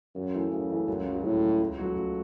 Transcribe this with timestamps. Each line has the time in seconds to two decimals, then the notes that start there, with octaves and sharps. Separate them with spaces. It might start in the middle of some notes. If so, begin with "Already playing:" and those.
0.15 F#2 C#3
0.33 E3 A3
0.51 F#2 C#3
0.69 E3 A3
0.87 C#2 F#2
1.06 C#3 F#3
1.24 C#2 A2
1.42 C#3 F#3
1.60 C#2
1.78 C#3 F#3 A3 F#4
1.96 C#2